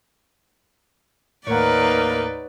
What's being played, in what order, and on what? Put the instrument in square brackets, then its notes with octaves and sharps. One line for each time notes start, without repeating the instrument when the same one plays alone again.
[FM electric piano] D#2 A2 [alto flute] A#3 [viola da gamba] D#4 B4 D5 [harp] C#5 F#5